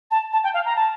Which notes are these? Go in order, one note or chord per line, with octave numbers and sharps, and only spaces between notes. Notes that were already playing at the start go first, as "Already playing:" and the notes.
A5
A5
G5
F5
A#5
A5